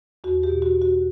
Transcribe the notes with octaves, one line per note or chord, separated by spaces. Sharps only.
E2 F#4
G4
B2
F#4
B2
F#4